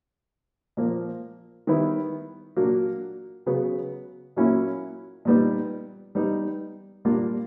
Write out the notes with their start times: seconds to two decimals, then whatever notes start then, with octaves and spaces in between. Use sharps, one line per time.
0.77 A#2 F3 A#3
1.67 D#3 G3 B3 E4
2.56 A#2 F#3 A#3 D4 F#4
3.46 C#3 F#3 B3
4.37 A#2 F#3 A#3 C#4 E4
5.25 A#2 G3 B3 D#4
6.15 G3 B3 D#4
7.05 A#2 G3 A#3 D4 F4